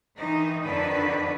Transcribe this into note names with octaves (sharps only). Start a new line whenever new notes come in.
D#3 E3 D#4
F2 D3 D#3 D4 B4